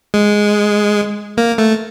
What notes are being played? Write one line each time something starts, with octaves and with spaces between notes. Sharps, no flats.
G#3
A#3
A3